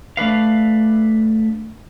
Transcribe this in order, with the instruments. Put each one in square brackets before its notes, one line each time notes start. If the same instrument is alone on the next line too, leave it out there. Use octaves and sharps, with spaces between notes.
[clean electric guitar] A3 D4 B4 F5